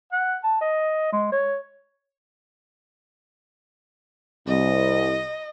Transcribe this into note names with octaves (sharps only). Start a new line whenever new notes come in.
F#5
A5
D#5
G#3
C#5
C2 D#5